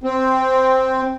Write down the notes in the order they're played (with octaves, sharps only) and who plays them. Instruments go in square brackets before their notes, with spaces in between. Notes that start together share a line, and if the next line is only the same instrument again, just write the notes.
[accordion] C4